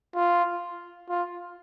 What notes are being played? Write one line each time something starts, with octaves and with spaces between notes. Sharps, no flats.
F4
F4